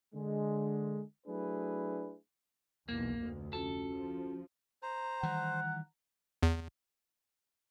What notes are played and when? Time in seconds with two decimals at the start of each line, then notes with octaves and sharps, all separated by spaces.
0.15 D3 G#3
1.27 F#3 A3 D4 E4 G#4 B4
2.89 B1 E2 A#3
3.19 F1 D2
3.53 C#4 F4 F#4 A4
3.91 F3
4.82 C5 A#5
5.23 D#3 E3 G3 F#5
6.43 E2